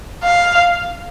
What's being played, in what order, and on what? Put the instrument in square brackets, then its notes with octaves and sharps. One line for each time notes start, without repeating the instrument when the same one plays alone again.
[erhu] F5